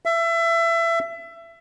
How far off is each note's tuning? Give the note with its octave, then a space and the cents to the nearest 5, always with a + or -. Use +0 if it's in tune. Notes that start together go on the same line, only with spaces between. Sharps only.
E5 +25